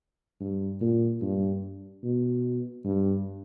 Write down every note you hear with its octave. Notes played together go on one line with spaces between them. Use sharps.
G2
A#2
G2
B2
G2